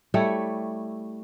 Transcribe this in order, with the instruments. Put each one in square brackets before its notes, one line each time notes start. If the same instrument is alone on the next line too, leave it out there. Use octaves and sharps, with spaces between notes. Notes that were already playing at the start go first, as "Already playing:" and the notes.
[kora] G3 A3 E4 C#5